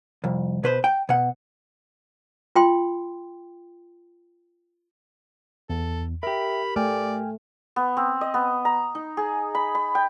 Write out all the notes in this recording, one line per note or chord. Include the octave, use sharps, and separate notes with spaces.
C2 F2
B2 B4 C5
G5
B2 F#5
F4 G5 C6
E2 A4
G4 A#4 E5 G5 B5
A3 D5 G5 G#5 F6
B3
C4
D#5
B3
A#5
D#4
G#4
B5
B5
G5